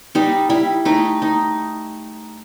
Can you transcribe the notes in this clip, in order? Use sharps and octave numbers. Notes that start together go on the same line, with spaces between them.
G3 D#4
G3 E4
A3 D#4
D#4